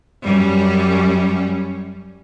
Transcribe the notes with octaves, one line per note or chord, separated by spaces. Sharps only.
F#2 G3 C#4